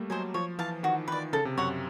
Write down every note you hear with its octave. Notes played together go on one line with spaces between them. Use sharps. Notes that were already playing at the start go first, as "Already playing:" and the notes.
Already playing: G3 A3 A#3
F#3 C5 D#5 G#5
F3 C#5
E3 F5 A5
D#3 F#4
D#3 B4 D5
C#3 A4
C3
F#2 C#5 F#5